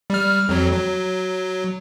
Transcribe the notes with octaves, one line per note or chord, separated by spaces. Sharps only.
G3 F6
F2 F#3
F#3